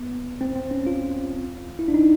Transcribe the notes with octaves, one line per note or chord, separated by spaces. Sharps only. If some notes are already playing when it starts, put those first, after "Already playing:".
Already playing: B3
C4
C4
C#4
F4
E4
D4
D#4